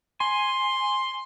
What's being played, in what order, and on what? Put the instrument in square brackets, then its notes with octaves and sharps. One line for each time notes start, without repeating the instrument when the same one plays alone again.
[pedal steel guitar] G#5 [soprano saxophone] C6